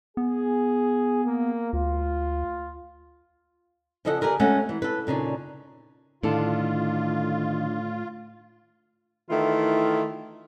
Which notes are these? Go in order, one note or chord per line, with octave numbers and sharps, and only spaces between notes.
B3 G#4
A#3
D2 F4
C#3 F3 A4 D#5 E5 F#5
D3 F4 G4 G#4 A#4 B4
G#3 A3 C#4 F#4 F#5
E3
A4 B4
A#2 C#3 D4 D#4
A2 D3 D#3 D4 F4 A4
D#3 E3 A3 E4 F4